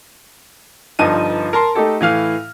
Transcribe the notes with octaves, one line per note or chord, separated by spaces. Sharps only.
G1 G2 F3 D#4 D#7
A#4 A5 C6
A3 D#4 G4 A4
A2 E3 F5 F6